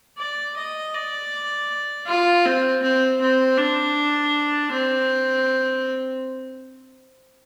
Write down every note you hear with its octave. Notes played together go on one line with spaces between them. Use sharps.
D5
D#5
D5
F4
C4
C4
C4
D4
C4